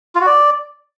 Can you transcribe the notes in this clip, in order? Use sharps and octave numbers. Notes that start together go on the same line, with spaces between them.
F4
F#4
D5